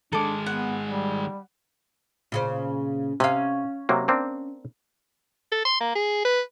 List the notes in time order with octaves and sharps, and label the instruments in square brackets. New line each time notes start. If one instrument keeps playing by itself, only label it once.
[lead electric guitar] D#3 G#3 [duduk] D4 [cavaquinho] A4 D6
[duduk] B3 [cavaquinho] F#5
[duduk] G3
[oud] A#2 C#3 C5
[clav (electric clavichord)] C3 [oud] C#4 F5
[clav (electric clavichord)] C3 F#3 A#3
A#3 C4 D4
[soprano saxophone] A4
C6
A#3
G#4
B4